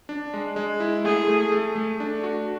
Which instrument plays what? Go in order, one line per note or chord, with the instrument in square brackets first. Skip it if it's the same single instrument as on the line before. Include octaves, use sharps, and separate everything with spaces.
[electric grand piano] D4
G#3
G#3
E4
[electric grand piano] A3 [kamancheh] G#4
[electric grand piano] A3
A3
A3
D4
F#4